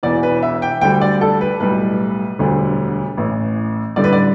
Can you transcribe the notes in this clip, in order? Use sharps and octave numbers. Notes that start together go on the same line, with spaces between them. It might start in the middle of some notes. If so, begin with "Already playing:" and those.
E1 E2 E3 D5
B4
E5
G5
D2 D3 G3 G5
D5
A4
B4
B1 A2 G3 B4
E1 D2 D3 G3
A1 A2 E3
A1 G2 D3 G3 D5
B4
D5